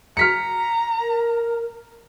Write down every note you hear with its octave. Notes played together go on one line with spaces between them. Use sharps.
A#5 F6 B6 C#7
A#4